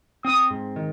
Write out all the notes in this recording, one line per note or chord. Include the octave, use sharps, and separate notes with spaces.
C4 D#6
G#2
D#3